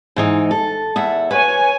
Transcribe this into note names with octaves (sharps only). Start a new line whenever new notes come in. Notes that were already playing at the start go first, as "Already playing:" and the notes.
G#2 E3 D#4
A4
E2 E5 F#5
B4 C#5 G#5